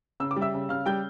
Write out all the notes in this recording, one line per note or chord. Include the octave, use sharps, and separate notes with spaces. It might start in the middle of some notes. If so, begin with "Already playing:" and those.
C#3 E6
D6
G3
E5 E6
C#3
C#3 F5 F6
G3 G5 G6